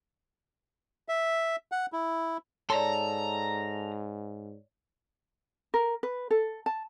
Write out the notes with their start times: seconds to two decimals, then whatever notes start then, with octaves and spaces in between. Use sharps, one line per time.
1.08 E5
1.72 F#5
1.93 E4
2.70 G#2 A4 C#5 D5 A#5 C6
5.74 A#4
6.03 B4
6.31 A4
6.66 A5